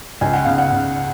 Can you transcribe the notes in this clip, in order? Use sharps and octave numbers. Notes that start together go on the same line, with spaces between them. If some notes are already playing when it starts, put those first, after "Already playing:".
C#2 G#5
F#5
C#3 F5
F#5
C#3